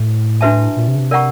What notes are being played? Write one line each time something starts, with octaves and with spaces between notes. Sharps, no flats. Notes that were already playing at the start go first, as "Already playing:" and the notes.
Already playing: A2
D4 F#4 B4 E5 A5
A#2
C3
C#3
C3
A#4 D5 F#5 A#5 C#6